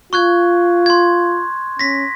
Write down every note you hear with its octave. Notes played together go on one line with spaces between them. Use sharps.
F4 C#6 F#6 G#6
C6 G#6
C#4 A#6 B6